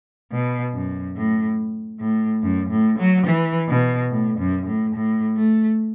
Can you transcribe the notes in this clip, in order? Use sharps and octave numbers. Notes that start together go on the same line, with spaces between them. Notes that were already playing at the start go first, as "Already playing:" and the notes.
B2
F#2
A2
A2
F#2
A2
F#3
E3
B2
A2
F#2
A2
A2
A3